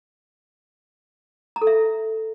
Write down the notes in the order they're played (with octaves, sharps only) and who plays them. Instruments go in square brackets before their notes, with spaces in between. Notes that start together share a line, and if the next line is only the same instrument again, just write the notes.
[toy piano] A#5
A4
E5